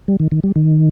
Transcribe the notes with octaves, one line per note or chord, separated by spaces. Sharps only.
G3
D#3
D#3
G3
D#3